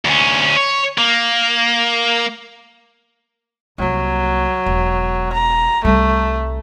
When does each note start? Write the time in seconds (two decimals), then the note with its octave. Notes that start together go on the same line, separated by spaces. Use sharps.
0.05 D2 C#4
0.57 C#5
0.98 A#3
3.78 C2 F#3 A#3
4.66 E1
5.33 A#5
5.85 C2 G3 A3